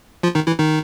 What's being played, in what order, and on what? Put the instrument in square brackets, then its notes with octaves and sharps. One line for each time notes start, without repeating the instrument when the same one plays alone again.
[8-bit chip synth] F3 F4
D#3 D#4
E3 E4
D#3 D#4